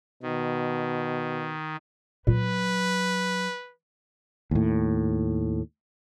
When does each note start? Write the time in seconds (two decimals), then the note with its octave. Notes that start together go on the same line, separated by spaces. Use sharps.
0.23 B2 D#3
2.27 A#2 F#3 B4
4.51 D#2 A2